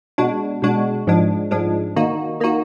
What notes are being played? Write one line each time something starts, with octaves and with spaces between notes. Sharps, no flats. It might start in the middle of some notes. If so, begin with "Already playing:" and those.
B2 G#3 D4 F#4
B2 G#3 D4 F#4
G#2 F3 G#3 D4
G#2 F3 G#3 D4
D#3 A#3 D#4 F#4
D#3 A#3 D#4 F#4